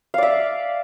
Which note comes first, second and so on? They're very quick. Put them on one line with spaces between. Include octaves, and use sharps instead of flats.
F5 D5 E5